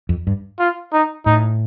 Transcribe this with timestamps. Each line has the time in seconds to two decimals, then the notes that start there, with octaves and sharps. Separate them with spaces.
0.09 F2
0.27 G2
0.59 F4
0.93 D#4
1.26 A2 D#4